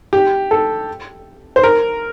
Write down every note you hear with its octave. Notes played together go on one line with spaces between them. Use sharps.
G4
A4
C5
A#4